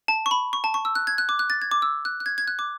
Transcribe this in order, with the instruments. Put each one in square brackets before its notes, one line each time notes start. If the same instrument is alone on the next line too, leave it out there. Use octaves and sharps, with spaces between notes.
[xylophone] A5
C#6
B5
C#6
A5
C#6
E6
F#6
G#6
F#6
D6
F#6
A6
G#6
D6
E6
F#6
F#6
G#6
G#6
F#6
D6